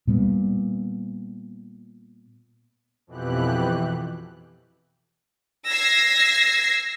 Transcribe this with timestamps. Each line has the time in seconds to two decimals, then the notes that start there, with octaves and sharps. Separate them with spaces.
0.07 A#2 G3 B3
3.07 F2 B2 E3 G4 F#6
5.68 E6 G#6 A#6 C7